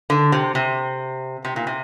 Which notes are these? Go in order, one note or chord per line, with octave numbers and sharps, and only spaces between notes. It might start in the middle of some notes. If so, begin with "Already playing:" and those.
D3
C3
C3
C3
A#2
C3